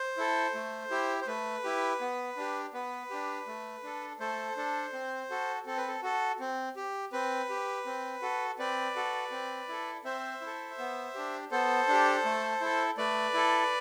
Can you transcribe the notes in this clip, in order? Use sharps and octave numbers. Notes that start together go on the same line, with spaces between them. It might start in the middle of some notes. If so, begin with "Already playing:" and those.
Already playing: C5
E4 A4
A3
E4 G4
C5
A3 B4
E4 G4
B3
D4 G4
B3 B4
D4 G4
A3
D4 A4
A3 A4 C5
D4 A4
C4
F#4 A4
C4 A4
B4
A4
F#4 A4
C4
G4
C4 B4
G4
C4
F#4 A4
C4 B4 D5
F#4 A4
C4
E4 A4
C4 C5 E5
E4
A4
B3
D4 G4
B3 A4 C5
D4 G4
A3
E4 A4
A3 B4 D5
E4 A4